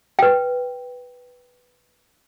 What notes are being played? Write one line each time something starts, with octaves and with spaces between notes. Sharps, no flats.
B4 G5